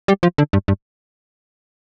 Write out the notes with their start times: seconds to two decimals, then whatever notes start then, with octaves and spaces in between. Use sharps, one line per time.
0.08 G3
0.23 F3
0.38 D3
0.53 G2
0.68 G2